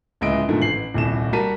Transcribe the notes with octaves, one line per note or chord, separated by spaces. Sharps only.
D1 C#2 G#3 D#5 E5 D7
G#2 B2 D3 D#3 F3 A3
A1 C7 F#7
D#1 C2 E7
G3 F#4 A#4 A5 B6 D#7